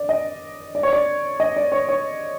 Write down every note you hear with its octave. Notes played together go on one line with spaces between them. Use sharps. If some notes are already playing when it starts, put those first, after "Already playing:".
Already playing: D5
D#5
D5
C#5
D5
D#5
D5
C#5
C#5